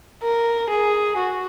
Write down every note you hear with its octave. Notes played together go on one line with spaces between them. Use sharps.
A#4
G#4
F#4